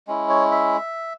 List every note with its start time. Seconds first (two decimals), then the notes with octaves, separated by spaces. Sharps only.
0.07 G#3 C#4 E4
0.29 C#5
0.52 E5